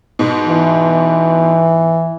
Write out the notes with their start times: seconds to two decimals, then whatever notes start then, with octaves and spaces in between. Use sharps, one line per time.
0.19 G#2 B2
0.48 E3